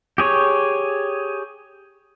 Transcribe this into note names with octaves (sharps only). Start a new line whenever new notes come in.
G4 G#4 C#5